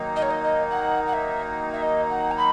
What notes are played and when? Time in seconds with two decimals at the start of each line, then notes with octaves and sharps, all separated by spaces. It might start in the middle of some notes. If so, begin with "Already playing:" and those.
Already playing: D#3 F#3 A#3 D#4
0.16 D#5
0.22 C#5
0.30 D#5
0.42 D#5
0.70 F#5
1.07 F#5
1.13 E5
1.73 E5
1.82 D#5
2.09 F#5
2.31 A#5
2.37 B5